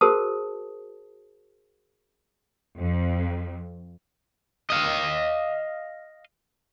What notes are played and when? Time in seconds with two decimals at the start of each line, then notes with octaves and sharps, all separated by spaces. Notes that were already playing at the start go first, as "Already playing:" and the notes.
0.01 F#4 G#4 A#4 C5 A5 D#6
2.79 F2
4.70 D#5 F5